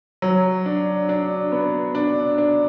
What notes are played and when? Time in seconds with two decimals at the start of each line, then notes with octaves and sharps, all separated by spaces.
0.22 F#3
0.66 D4
1.09 D4
1.52 B3
1.95 D4
2.38 D4